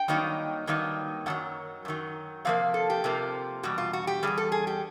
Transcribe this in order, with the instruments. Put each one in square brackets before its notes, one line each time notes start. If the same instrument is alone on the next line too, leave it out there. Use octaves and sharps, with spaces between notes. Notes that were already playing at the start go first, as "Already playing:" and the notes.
Already playing: [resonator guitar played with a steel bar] G5
G2 D#3 F#3 A#3 D#4
G2 D#3 F#3 A#3 D#4
F#2 D#3 F#3 F#5
F#2 D#3 F#3
C3 F3 A#3 F5
A4
G4
C3 F3 A#3
E2 B2 G3 F#4
F4
F#4
G4
B2 G3 G#4
E2
A4
G#4
G4